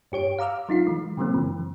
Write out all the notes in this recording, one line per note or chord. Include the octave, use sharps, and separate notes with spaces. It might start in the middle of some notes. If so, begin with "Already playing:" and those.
G2 G4 C#5 D7
F5 A#5 D6 E6 F6
F#3 D#4 F4 C7
E3 G#3
C#3 E3 F#3 G#3 A#3 C4
F#2 C#3 E3 F3